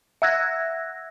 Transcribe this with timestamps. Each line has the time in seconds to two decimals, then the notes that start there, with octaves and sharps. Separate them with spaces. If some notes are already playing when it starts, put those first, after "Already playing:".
0.22 E5 F#5 E6 F#6 G#6 A#6